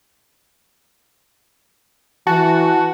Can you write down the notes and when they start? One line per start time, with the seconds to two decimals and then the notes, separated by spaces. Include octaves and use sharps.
2.27 E3 F#4 A5